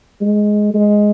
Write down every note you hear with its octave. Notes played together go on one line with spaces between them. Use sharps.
G#3
G#3